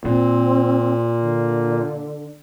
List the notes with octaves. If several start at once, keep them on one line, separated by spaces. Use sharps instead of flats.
A#2 C4
D3